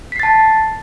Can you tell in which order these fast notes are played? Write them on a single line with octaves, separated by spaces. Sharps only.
B6 C7 A6 A5